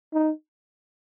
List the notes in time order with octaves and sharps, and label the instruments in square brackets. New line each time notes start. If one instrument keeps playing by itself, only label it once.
[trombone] D#4